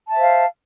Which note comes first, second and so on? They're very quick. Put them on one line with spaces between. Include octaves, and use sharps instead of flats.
A5 E5 C5 F5